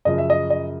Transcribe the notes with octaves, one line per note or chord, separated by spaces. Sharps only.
F#2 C#3 F3 D#5
E5
D#5
D#5